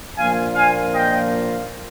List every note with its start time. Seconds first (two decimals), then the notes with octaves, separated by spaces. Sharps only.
0.17 A#2 F3 A#3 D4 F4 F5 G#5
0.56 F5 G#5
0.94 D#5 G5